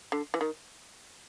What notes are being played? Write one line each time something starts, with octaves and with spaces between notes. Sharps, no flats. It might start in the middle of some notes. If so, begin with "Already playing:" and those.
D3
E3
D#3